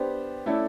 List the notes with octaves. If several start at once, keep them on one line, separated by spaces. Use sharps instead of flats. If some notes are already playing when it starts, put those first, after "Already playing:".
Already playing: B3 D4 G4 C5
A3 C#4 E4 A4 D5